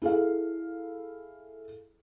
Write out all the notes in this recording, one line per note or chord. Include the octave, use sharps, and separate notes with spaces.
E4 G#4 A4 F5